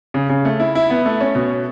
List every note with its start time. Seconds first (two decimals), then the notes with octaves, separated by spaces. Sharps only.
0.14 C#3
0.29 C#3
0.45 A3
0.60 E4
0.75 E4
0.90 B3
1.05 A3
1.20 C#4
1.35 B2